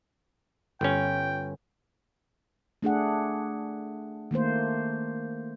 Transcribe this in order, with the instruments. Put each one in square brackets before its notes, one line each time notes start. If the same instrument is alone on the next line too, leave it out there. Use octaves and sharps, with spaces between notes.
[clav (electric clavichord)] G1 C#4 [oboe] G5
[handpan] A3 D4 G#4 F#5
D#3 A3 A#3 C5